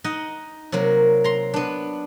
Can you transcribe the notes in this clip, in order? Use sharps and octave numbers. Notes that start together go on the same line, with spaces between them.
D#4 D#5 F#5
C3 F#3 A#3
A#5 C6
B3 D4